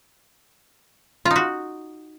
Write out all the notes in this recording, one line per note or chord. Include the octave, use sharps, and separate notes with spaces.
F4
D#4
F#4